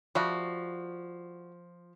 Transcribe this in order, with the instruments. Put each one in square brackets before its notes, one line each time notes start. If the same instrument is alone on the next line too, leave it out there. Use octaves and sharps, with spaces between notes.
[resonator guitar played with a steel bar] F3 [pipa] G3 A3 F#4